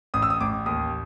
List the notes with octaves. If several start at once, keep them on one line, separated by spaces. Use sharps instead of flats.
A1 D#6
E6
D#6
A1 D6
D#2 D#6